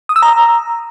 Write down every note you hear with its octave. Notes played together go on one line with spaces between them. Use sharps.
D#6
E6
A#5